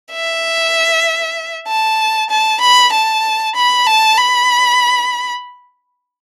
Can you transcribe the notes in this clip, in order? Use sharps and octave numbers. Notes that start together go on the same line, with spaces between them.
E5
A5
A5
B5
A5
B5
A5
B5